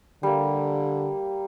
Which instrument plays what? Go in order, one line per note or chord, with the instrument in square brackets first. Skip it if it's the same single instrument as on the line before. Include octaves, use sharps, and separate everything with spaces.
[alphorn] D3 [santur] G3 A#3